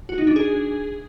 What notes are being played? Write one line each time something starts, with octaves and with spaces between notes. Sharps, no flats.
F#4
D#4
D4
G#4